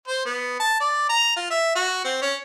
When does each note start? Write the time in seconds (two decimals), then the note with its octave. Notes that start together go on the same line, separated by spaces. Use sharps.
0.08 C5
0.26 B3
0.60 A5
0.80 D5
1.09 A#5
1.36 F4
1.50 E5
1.75 F#4
2.04 C4
2.21 C#4